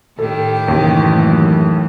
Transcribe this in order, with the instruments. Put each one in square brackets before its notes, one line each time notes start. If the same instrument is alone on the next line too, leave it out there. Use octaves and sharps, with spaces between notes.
[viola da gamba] A2 D#3 G4 [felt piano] A4
[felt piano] F#1 [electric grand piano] D#2 [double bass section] E3 F#3 A3